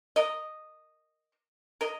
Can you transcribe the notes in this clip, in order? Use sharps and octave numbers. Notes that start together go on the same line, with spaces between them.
A#4 D#5
A#4 D#5